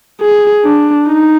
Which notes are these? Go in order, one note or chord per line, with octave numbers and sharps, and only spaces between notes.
G#4
D4
D#4